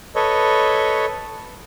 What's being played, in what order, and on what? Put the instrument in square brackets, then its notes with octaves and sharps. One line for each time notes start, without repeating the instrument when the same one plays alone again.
[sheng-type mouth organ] A4 B4 C#5 D#5